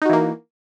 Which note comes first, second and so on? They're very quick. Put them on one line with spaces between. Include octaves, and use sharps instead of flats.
D#4 F#4 E3 A#3